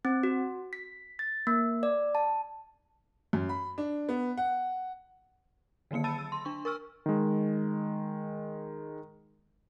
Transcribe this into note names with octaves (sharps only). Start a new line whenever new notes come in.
C4
F#4
B6
A6
A#3
D5
A5
F#2
B5
D4
B3
F#5
D3 D#3 F#3 A#3 C#7
A5 B5 E6 A6 D#7
E6
C6
D4 C#6
A#4 C#6 E6 F6
D#3 G#3